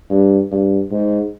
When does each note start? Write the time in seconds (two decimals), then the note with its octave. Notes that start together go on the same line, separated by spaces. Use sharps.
0.10 G2
0.51 G2
0.91 G#2